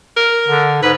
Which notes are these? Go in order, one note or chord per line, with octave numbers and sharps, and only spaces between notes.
A#4
D3
G#2 B4